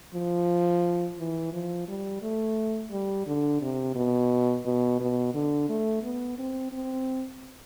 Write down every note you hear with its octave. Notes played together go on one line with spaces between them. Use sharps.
F3
E3
F3
G3
A3
G3
D3
C3
B2
B2
B2
D3
A3
B3
C4
C4